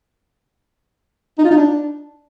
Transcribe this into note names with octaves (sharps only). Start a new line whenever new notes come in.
D#4
F4
D#4
D4